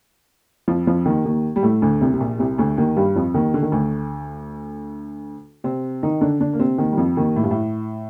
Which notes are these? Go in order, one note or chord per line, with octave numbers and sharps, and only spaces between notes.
F2 F3
F2 F3
D#2 D#3
D#2 D#3
G3
A2 A3
D2 D3
C2 C3
C3
A#1 A#2
C2 C3
D2 D3
D#2 D#3
G2 G3
F2 F3
D#2 D#3
D3
D#3
D2 D3
C3 C4
D#3 D#4
D3 D4
D3 D4
A#3
C3 C4
D#2 D#3
G3
F2 F3
D#2 D#3
A2
G2
A2